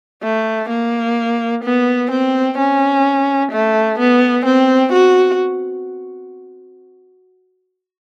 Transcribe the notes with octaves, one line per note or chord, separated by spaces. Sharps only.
A3
A#3
B3
C4
C#4
A3
B3
C4
F#4